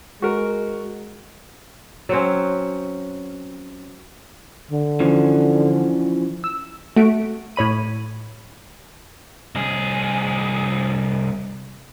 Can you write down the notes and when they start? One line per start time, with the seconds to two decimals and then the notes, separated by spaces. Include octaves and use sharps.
0.22 G#3 F#4 A#4
2.09 F#3 C4 C#4
4.71 D3
5.00 E3 F3 C#4
6.44 E6
6.97 A3 F#4 D7
7.56 A2 C#5 B5 D#7
9.55 C2 G#4